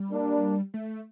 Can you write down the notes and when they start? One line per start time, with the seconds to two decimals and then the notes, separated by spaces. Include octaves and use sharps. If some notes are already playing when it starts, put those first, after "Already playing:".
Already playing: G3
0.11 A#3 D4
0.74 A3